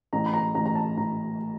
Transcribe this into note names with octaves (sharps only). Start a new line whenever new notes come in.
A1 A#5
B5
A#5
A1 A#5
A#5
A5
A1 A#5